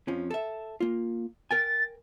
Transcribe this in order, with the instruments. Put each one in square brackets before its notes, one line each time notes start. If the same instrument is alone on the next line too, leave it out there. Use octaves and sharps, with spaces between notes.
[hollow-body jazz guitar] F2 F3 C#4
A4 E5
A#3 F4
[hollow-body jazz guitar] A#4 G5 G#5 [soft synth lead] A6